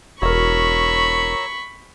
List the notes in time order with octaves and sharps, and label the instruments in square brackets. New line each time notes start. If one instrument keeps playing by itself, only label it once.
[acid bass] E1 [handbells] F#4 A#4 [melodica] C#5 A#5 E6 [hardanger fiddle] B5 C#6